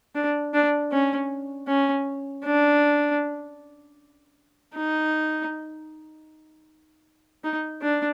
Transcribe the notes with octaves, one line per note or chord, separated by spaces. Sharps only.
D4
D4
C#4
C#4
D4
D#4
D#4
D4